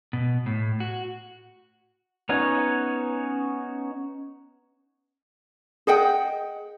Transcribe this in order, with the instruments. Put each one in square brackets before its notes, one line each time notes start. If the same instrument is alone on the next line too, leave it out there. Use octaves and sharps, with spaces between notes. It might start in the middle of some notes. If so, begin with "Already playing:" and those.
[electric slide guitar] B2
A2
F#4
[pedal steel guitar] B3 C#4 D#4 F#4 C#5
[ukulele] G#4 D#5 F#5 G5